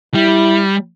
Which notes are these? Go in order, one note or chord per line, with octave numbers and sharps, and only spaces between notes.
G3 E4